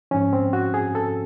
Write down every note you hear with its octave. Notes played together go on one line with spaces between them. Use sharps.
G#2 F3 C#4
C4
F#4
G#4
A4